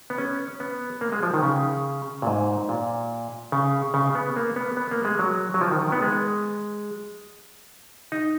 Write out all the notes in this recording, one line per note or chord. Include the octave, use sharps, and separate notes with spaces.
B3
C#4
B3
A#3
G#3
F3
D#3
C#3
A#2
G#2
A#2
C#3
C#3
B3
A#3
B3
B3
A#3
G#3
F#3
F#3
F3
D#3
D#3
B3
G#3
D#4